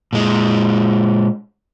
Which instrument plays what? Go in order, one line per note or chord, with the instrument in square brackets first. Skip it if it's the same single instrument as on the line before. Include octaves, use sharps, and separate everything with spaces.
[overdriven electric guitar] A#2 G#3